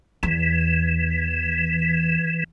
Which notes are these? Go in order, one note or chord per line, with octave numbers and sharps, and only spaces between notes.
E2 E3